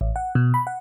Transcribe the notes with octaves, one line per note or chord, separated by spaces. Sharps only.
A1
F#5
B2
B5
F#5